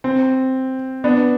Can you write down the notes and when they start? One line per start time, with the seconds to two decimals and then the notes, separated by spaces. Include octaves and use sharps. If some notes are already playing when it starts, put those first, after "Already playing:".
0.04 C4
1.04 B3 D4